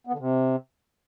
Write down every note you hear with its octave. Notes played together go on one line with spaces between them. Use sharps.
B3
D3
C3